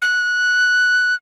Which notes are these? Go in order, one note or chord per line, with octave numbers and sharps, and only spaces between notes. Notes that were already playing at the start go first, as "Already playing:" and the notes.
F#6